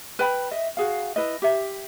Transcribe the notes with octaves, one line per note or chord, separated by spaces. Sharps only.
B4 G5 B5
D#5 E5
F#4 G#4 F5
E4 B4 D#5
G4 E5